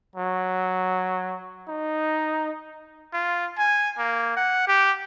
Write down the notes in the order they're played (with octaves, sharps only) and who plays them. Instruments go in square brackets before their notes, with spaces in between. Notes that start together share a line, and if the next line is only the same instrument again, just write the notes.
[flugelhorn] F#3
D#4
[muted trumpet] F4
G#5
A#3
F#5
G4